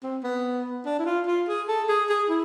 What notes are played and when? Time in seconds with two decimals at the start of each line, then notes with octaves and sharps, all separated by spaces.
0.03 C4
0.23 B3
0.86 D4
0.99 E4
1.06 F4
1.26 F4
1.48 G#4
1.68 A4
1.89 G#4
2.09 G#4
2.29 E4